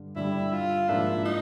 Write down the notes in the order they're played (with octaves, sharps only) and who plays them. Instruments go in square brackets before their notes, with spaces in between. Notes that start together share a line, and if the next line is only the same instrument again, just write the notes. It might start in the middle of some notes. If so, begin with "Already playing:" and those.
Already playing: [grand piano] G2 D3
[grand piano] G2 D3 G3 [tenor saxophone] E4
[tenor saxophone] F4
[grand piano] G#2 F3 A#3 D4 [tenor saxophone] E4
[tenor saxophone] D#4